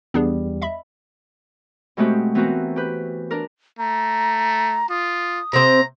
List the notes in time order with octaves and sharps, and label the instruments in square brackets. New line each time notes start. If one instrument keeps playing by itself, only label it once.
[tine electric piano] E2 G3 [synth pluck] B3 D4 G#4
[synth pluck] D#5 E5 B5
[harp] B2 G#3 A3 C4 F#4 G4
E3 B3 C4 F#4 A#4
G4 B4 G6
D4 A#4
[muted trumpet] A3 [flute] A#5
[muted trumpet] F4 [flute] D#6
[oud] C3 C4 [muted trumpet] A#5